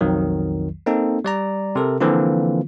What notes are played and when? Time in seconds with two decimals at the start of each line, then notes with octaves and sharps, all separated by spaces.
0.01 B1 F2 D#3 F#3
0.86 A#3 C4 D#4 A4
1.24 G3 D5 A#5
1.75 C3 A4 A#4
2.00 D3 E3 F3 A#3 C4 F4